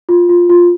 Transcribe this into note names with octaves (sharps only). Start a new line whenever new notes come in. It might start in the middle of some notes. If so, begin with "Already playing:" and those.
F4
F4
F4